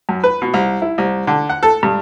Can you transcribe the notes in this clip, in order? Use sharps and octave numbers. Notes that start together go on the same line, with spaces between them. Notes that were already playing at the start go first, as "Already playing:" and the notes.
F#2
B4
B2
C2
E4
C2
D3
F#5
A4
G2